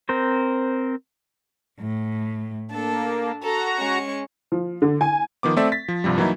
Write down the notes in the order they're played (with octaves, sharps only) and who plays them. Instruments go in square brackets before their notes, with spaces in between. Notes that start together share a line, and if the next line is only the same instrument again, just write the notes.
[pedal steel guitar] C4 A#4 C5
[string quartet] A2
[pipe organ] A#3 [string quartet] D4 A4
[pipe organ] F#4 A#5 [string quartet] A4
[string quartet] G#3 C#4 C#6
[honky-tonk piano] F3
D3
G#5
[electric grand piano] D#3 F3 B3 D6
A3 C4 A4 D5 E5
A6 B6
F3
C2 G2 C3 F3 G3
E3 F#3 A#3 D#4 E4